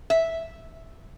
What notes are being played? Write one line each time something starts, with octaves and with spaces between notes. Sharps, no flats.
E5